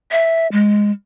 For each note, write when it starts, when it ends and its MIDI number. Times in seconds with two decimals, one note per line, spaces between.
0.12 0.47 76
0.52 0.92 56